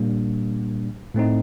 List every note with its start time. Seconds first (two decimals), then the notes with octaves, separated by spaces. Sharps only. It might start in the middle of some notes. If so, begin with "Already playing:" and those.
Already playing: A#2 G3 A#3 D4
1.14 A2 A3 C4 D#4